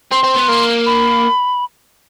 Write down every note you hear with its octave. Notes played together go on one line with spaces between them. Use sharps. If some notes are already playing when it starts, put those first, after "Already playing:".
C4 C6
C4
B3
A#3
B5